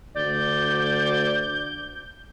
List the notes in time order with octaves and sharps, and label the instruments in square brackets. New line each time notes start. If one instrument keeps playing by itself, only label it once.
[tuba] D2 [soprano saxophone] D5 [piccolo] G6